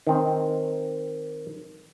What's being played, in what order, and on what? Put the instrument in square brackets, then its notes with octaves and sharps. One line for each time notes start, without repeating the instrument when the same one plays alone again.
[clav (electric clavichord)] D#3 C4